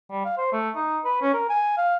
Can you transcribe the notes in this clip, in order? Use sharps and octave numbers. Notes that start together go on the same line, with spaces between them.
G3
F5
C5
A3
D#4
B4
C#4
A#4
G#5
F5